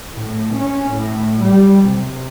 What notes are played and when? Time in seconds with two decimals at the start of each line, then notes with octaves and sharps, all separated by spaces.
0.19 A2
0.54 C#4
0.95 A2
1.44 G3
1.88 C3